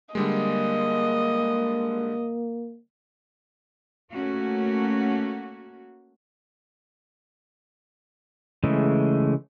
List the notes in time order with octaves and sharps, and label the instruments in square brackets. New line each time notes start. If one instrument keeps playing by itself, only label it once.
[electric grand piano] D3 G3 G#3 [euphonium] A#3 [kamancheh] D#5
[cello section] A3 A#3 C#4 F#4
[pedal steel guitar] C#3 E3 G#3 A3